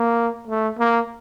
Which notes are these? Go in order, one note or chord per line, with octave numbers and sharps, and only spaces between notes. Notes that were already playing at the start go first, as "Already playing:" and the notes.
Already playing: A#3
A3
A#3